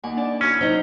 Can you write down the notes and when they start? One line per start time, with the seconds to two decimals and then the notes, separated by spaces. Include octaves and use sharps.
0.04 D#2 F#5 G#5 D6
0.17 D4 D5
0.41 C#4 E4 F#4 E5
0.61 F#3 D#4 C5